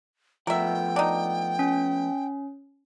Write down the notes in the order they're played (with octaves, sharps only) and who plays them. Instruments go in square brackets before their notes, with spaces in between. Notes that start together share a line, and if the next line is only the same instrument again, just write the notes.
[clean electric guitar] F3 A3 B3 [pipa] A#4 E5 [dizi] G5
[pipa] D4 D#4
[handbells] C#4